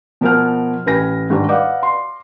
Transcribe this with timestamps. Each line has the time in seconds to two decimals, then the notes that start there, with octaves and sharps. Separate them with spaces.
0.21 B2 F3 A#4 F#5 G#5 F6
0.86 A1 B4 G#5 A#6
1.30 G#2 D#3 G3 D4
1.49 B4 D5 D#5 F5 F#5 D6
1.83 C6